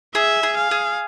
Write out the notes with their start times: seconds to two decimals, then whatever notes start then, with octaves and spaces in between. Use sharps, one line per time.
0.15 G#4 E5
0.43 G#4
0.57 F5
0.71 G#4